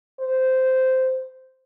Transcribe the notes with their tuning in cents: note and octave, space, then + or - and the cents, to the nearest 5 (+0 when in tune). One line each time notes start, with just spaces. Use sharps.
C5 -10